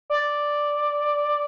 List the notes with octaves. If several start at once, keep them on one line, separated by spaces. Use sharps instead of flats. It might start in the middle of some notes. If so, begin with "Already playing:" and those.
D5